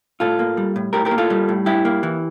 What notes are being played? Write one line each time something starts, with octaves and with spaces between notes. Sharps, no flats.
A2 F4 A4
A#3
G3
A2
A2 G4 A#4
G4 A#4
A#3
F4 A4
G3
A2
G2 E4 G4
A#3
E3